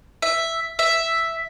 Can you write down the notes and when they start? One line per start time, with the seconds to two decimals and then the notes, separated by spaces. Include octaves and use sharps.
0.22 E5
0.79 E5